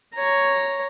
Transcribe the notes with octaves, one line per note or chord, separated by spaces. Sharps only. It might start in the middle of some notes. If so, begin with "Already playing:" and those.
C#5 A#5